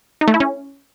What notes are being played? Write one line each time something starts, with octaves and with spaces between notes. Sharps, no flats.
D#4
A3
E4
C#4